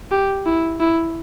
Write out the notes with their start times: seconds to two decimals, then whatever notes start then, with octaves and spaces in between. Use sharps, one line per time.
0.11 G4
0.46 E4
0.80 E4